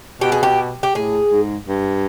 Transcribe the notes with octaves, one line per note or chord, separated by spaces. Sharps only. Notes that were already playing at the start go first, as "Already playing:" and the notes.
B2 G4
G#4
G4
G4
A2 G#4
G#2
G2